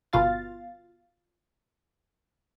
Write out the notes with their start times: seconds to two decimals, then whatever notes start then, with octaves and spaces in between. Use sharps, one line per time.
0.13 G1 B2 F4 F5 A6